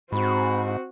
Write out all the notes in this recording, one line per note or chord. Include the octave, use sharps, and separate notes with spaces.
G#2 C4 F#4 B5